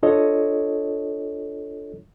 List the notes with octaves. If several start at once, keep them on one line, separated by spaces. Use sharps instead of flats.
D4 F4 A4 C#5 D#5